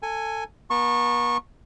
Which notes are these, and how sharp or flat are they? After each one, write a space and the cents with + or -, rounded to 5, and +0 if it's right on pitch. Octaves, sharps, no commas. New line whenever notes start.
A4 +20 G#5 +0
B3 -45 A5 +25 C#6 -20